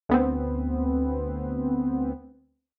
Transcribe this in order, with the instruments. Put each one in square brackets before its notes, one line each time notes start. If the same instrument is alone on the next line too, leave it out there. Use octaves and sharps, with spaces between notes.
[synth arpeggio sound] D2 B3 C4